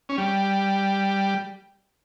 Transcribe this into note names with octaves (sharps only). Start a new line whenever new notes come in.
C#4
G3